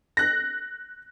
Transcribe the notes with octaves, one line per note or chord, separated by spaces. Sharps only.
F#6 A#6